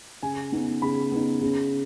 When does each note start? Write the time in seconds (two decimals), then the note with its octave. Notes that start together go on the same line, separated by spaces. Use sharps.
0.23 C#3 G#5
0.52 B3 D#4
0.82 C#3 B5
1.12 B3 D#4
1.41 C#3